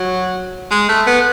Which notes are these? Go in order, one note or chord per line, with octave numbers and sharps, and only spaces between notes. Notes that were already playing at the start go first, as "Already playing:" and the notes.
Already playing: F#3
G#3
A3
B3